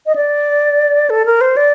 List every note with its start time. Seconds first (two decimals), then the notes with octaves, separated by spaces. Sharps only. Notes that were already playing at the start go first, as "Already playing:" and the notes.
0.06 D#5
0.16 D5
1.10 A4
1.26 A#4
1.41 C5
1.57 D5